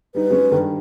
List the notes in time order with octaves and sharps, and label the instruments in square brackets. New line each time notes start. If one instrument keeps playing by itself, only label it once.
[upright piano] G3 D#4 [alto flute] B4
[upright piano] F#3 G#3 C#4
G2 D#3